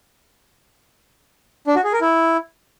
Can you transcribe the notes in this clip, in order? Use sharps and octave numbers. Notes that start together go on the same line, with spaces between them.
D4
F#4
G#4
A#4
E4